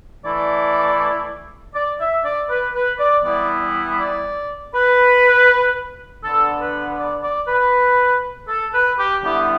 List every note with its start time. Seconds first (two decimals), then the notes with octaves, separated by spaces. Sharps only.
0.25 E3 A3 E4 D5
1.74 D5
2.00 E5
2.24 D5
2.50 B4
2.75 B4
2.99 D5
3.24 E3 G3 B3 E4 D5
4.00 D5
4.74 B4
6.24 D3 B3 D4 A4
6.61 B4
6.99 D5
7.24 D5
7.48 B4
8.48 A4
8.74 B4
8.98 G4
9.23 D3 G3 B3 E4 G4